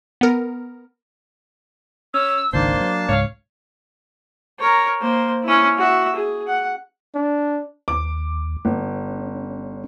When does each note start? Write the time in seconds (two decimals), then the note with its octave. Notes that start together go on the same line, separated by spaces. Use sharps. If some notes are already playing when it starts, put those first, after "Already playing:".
0.21 B3 A#4
2.14 C#4 E6
2.53 G#1 C#2 D#3 A#3 D4 C5 A5 C7
2.77 E3 F#3
3.09 C#2 G#2 C#5 F5
4.59 A#4 C#5
5.01 A#3 C5
5.43 C#4 E4
5.77 F#4 E5
6.15 G#4
6.47 F#5
7.15 D4
7.88 D#2 D6
8.65 G1 C#4